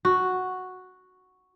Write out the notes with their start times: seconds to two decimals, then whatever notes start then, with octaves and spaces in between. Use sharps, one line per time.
0.05 F#4